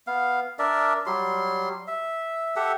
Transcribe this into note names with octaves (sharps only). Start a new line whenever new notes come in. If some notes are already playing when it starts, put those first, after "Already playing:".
B3 F5
D4 A#4 D5 E5
F#3 G3 C6
E5
G4 A4 E5 F#5